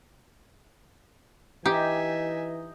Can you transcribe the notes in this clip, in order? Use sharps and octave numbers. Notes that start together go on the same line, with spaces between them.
E3 D#4 G4 E5 G#5